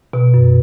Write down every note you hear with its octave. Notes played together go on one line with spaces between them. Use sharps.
B2
F#2